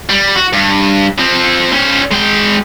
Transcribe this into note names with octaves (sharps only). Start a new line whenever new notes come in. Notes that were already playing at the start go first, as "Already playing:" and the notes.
G3
F#4
G2
F3 C4
C#4 C5
G#3 G5